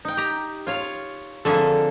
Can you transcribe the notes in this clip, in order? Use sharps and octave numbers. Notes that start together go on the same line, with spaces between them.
D#4 G5
G4 A#5
F4 C#5 F5
F2 D3 A#3 G#4 A4 E5